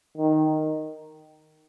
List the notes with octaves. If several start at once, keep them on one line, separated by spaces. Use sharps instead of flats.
D#3